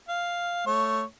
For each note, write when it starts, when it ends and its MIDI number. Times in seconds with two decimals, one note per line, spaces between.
0.09 0.62 77
0.66 1.03 57
0.66 1.03 73